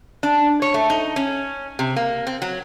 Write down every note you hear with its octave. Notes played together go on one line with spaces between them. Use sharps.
D4
C#5
A3
D#4
C#4
C3
A#3
C4
F#3